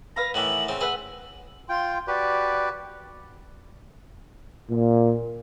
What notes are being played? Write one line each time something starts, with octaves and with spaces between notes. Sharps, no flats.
B4 F5 B5 A#6
A2 D#3 E3 E5 F#5 F#7
C#3 C4
G#4 B4 E5 F#5 F#7
F4 G5 C6
F#4 G4 B4 D5
A#2